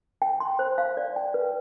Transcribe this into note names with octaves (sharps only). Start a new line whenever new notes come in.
G5
C6
C5
F5
D5
G5
B4